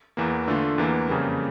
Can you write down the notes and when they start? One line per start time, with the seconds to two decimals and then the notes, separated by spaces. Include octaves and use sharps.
0.17 E2 E3 A#3
0.48 D3 A3 D4 F4
0.78 E2 E3 A#3
1.08 F2 C#3 G3 A#3